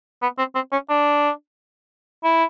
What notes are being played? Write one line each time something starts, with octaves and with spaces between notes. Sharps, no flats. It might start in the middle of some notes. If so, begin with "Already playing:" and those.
B3
C4
C4
C#4
D4
E4